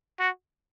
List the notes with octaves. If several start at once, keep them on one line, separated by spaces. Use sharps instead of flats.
F#4